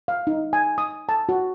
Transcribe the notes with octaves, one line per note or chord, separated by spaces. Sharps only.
F5
D#4
G#5
D#6
A5
F#4